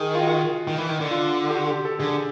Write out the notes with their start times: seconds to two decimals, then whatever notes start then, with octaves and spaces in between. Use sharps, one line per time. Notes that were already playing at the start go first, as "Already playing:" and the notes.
Already playing: D#3 G#4
0.15 F4
0.23 F#4
0.67 D#3
0.78 E3
0.89 D#3
1.01 D3
1.11 F4
1.50 G4
1.55 F#4
1.70 G4
1.85 A4
1.99 D3 G#4